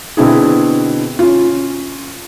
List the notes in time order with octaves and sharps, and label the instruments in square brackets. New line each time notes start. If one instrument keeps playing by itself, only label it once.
[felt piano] B2 D3 C4 D4 E4 G#4
C#4 F4